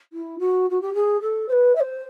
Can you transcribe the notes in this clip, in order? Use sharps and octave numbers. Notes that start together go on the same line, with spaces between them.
E4
F#4
F#4
G4
G#4
A4
C5
B4
E5
C5